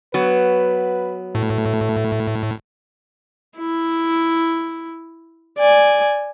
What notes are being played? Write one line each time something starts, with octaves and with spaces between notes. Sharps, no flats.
F#3 B3 B4
A2 A3
E4
D5 G#5